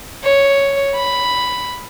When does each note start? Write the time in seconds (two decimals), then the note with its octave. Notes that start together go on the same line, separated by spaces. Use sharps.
0.24 C#5
0.96 B5